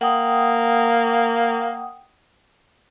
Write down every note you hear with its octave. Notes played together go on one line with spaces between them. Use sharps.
A#3 F#5 G5 D#6